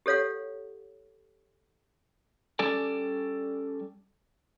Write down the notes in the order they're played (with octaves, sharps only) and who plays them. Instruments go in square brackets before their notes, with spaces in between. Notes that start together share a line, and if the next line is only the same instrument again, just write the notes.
[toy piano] G4 A4 C#5 F5 F#5
[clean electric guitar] G3 C#4 A4 D5 G#5